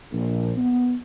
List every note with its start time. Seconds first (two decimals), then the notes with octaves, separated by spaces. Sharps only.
0.12 A#1
0.57 B3